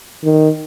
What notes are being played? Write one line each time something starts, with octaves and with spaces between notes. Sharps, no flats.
D#3